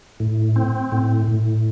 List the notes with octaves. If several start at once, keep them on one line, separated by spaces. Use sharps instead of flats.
A2
C4
A2
A2